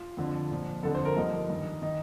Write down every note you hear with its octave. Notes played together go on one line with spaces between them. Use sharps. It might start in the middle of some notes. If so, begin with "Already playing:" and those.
Already playing: F4
F2 D3 F3
A#2 F3
F2 D3 F3 A4
C5
A#4
G2 D3 F3 D#4
G2 D#3
D#3 D#4